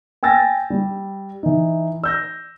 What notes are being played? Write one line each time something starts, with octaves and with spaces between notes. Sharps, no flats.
G5 G#5 E6 A6 A#6
G3
E3 D#4
E6 G6 A#6